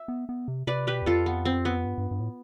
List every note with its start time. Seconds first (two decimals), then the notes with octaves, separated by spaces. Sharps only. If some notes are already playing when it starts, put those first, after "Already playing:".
Already playing: E5
0.08 B3
0.29 B3
0.48 C3
0.67 C3 B4 D5
0.87 B2 G4 B4
1.02 E2
1.06 F2 F4 A4
1.26 B3
1.45 C4
1.65 B3
1.85 G2
1.98 G2
2.11 G2
2.20 A2